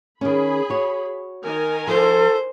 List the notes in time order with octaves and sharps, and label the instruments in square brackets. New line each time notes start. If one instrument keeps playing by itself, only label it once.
[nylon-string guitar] D#3 C#4 [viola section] G#4 B5
[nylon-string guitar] F#4 C#5
[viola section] D#3 A#4 G#5
[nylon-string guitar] F3 [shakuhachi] A4 [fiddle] C5